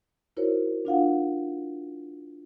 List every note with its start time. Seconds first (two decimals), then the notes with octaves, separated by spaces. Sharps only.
0.37 D#4 E4 F#4 A#4 C5 C#5
0.85 D4 F4 F5 F#5